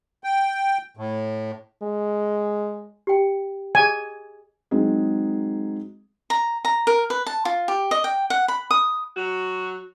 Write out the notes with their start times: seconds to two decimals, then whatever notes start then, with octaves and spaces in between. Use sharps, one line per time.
0.24 G5
0.97 A2
1.82 G#3
3.07 G4 G5
3.75 G#4 D#5 G#5
4.71 F#3 G#3 C4 D#4 G#4
6.30 A#5
6.65 A#5
6.87 A#4
7.10 B4
7.26 A5
7.45 F4
7.68 G4
7.91 D#5
8.04 G5
8.30 F#5
8.48 B5
8.71 D#6
9.17 F#3 F#4